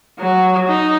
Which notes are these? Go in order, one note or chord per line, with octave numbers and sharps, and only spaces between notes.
F#3
D#4